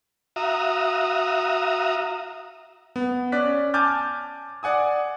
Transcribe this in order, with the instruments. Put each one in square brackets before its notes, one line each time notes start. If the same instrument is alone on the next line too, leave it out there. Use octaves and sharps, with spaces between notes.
[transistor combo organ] F#4 E5 F5 A#5 D#6
[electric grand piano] B3
C#4 D5 F#6 B6
G#5 A5 D6 F6 G6 A6
D5 F#5 G#5 D#6